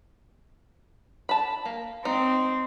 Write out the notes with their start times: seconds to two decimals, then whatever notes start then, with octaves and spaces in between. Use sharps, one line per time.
1.29 A5 B5
1.65 A#3
2.05 C4 D#4